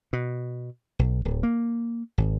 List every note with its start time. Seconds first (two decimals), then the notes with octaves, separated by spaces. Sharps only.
0.13 B2
0.99 B1
1.25 D1
1.43 A#3
2.18 G#1